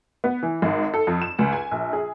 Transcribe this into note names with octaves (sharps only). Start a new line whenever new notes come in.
B3
E3
G#1
A4
F2
E7
C#2
G#5
A#1
G#4